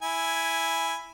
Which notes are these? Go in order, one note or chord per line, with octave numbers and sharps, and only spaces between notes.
E4 G#5